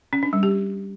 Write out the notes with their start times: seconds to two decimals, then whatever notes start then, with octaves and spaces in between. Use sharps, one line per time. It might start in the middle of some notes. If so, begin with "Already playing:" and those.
0.13 C#4
0.23 D4
0.33 G3
0.43 G4